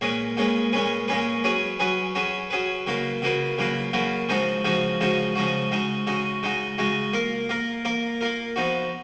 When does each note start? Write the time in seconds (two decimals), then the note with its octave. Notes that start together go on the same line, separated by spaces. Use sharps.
0.01 A#2 G#3 C#4 G#4 B4
0.37 A#2 G#3 C#4 G#4 B4
0.72 A#2 G#3 C#4 G#4 B4
1.08 A#2 G#3 C#4 G#4 B4
1.44 F#3 C#4 G#4 B4
1.79 F#3 C#4 G#4 B4
2.15 F#3 C#4 G#4 B4
2.50 F#3 C#4 G#4 B4
2.87 C#3 F#3 A#3 F4 B4
3.22 C#3 F#3 A#3 F4 B4
3.58 C#3 F#3 A#3 F4 B4
3.93 C#3 F#3 A#3 F4 B4
4.29 C#3 F3 G#3 D#4 F#4
4.64 C#3 F3 G#3 D#4 F#4
5.01 C#3 F3 G#3 D#4 F#4
5.35 C#3 F3 G#3 D#4 F#4
5.71 C#3 G#3 D#4 F#4
6.07 C#3 G#3 D#4 F#4
6.43 C#3 G#3 D#4 F#4
6.78 C#3 G#3 D#4 F#4
7.13 A#3 F4 A#4
7.49 A#3 F4 A#4
7.85 A#3 F4 A#4
8.21 A#3 F4 A#4
8.56 F3 B3 D#4 F#4